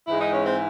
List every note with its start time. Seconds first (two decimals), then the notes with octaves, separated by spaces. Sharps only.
0.07 G#2 E3 G#3 E4
0.20 D#4
0.33 C#4
0.46 C4